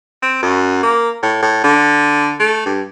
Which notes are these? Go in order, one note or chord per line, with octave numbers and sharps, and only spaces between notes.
C4
F#2
A#3
A2
A2
D3
A3
G2